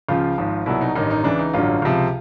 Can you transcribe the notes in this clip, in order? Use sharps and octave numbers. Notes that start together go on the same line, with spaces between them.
C#2 C#3 F3 F4
G#1 G#2 F3
C2 B2 F#3 E4
D#4
A1 G2 D#3 D#4
D#4
C#2 C#3 E3 D4
D#4
A1 G2 D3 F#3 F4
C#2 C3 F3